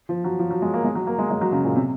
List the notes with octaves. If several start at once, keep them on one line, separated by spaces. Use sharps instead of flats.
F3
F#3
F3
F#3
G#3
A#3
G#3
F#3
A#3
G#3
G#3
F#3
C#3
A#2
C3